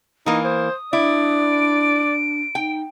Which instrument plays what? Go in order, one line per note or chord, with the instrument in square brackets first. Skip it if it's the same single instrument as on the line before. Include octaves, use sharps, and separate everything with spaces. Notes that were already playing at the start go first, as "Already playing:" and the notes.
[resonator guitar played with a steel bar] E3 A#3 [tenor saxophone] D#4
[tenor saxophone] C5 [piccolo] D#6
[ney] D4 [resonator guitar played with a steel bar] E4 [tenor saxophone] D5
[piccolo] D7
[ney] D#4 [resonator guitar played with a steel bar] G5